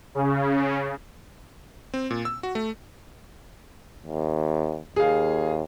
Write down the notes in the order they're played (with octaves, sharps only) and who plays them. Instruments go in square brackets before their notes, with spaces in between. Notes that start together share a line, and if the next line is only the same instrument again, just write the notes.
[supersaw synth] C#3
[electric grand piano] C4
A#2
E6
F#4
A3
[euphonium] D#2
[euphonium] D#2 [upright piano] G#4 F5